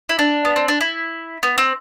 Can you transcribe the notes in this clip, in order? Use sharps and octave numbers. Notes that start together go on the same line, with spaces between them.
E4
D4
B3
C4
D4
E4
B3
C4